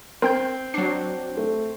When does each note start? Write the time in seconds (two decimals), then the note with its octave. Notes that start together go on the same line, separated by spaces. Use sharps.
0.22 C4 A#4 G5 G6
0.74 F#3 D4 C7
1.37 A3